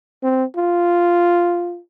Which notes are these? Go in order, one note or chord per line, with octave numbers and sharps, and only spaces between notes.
C4
F4